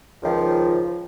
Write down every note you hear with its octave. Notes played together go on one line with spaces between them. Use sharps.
C#2 D#3 F3